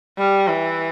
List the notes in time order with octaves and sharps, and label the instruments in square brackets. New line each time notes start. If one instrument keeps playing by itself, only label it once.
[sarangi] G3
E3